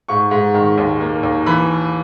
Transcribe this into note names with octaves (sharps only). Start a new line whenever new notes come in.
G#2 C#6
G#2
D#3
D#2
A#3
D#2
E3 B5